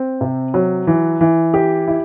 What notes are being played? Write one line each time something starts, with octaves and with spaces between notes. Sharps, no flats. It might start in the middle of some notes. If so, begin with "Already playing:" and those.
Already playing: C4
C3
F#3
E3
E3
G4
E4